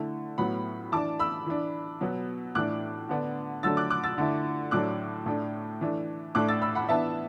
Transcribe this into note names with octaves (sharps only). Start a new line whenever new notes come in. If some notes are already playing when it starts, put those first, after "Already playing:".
Already playing: D3 A3 E4
A2 F#3 B3 F#5 B5
E3 D4 A5 D6
B5 E6
E3 D4
B2 F#3 B3
A2 E3 D4 D6 F#6
D3 B3 D4
D3 F#3 A3 D4 E6 A6
D6 F#6
D6 F#6
E6 A6
D3 A3 E4
A2 F#3 A3 D4 D6 F#6
A2 A3 D4
E3 A3 D4
A2 A3 D4 D6 F#6
E6 A6
B5 E6
F#5 B5
E3 B3 D4 E5 A5